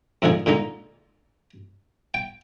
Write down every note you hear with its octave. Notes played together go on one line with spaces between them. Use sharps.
F2 G#2 D3 F3 G#4
A#2 D3 G#3 D#4
G5